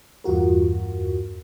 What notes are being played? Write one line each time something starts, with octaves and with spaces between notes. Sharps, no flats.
E2 G2 F4 F#4 A#4